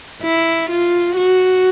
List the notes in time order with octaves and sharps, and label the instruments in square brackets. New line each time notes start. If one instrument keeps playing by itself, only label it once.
[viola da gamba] E4
F4
F#4